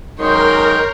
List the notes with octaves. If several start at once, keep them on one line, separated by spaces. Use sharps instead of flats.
F#2 D#3 G#3 A#4 C#5 C6 G6